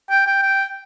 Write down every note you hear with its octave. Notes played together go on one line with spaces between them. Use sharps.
G5
G5
G5